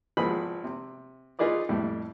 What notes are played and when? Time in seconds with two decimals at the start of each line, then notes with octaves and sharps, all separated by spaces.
0.17 G#1 F3 B3 G#4 B5
0.64 C3
1.39 D#4 F4 G#4 B4 D5 D#5
1.69 F2 A2 G3 E4